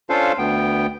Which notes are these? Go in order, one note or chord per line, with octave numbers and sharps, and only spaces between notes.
C#4 D4 F4 A4 C5 F5
D2 B3 G5